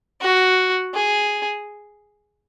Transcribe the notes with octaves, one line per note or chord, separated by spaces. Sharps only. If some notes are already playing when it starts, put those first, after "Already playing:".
F#4
G#4